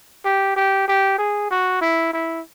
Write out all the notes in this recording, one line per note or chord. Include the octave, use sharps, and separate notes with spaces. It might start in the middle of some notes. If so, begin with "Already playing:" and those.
G4
G4
G4
G#4
F#4
E4
E4